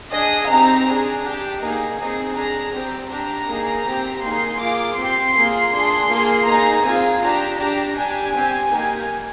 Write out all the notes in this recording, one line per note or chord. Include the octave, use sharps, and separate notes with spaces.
D4 G#4 D#5
C4 D#4 G4 A#5
D4 G#4
D4 G4
A#3 D#4 G#4
C4 D#4 G#4
D4 G#4 A#5
C4 G4
D4 G4 A#5
A#3 D#4 G#4
C4 G4
A#3 D#4 G#4 C6
A#3 F4 G#4 D6
C4 G4 C6
A#3 F4 G#4
D4 G#4 C6
A#3 F4 G#4
A#3 D#4 G#4 A#5
C4 F4 G#4 G#5
D4 G4 A#5
D4 G4 A#5
D4 G4 G#5
C4 G4
A#3 D#4 G4 G#5